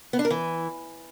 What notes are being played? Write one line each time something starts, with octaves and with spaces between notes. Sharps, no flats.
B3
D4
A#4
E3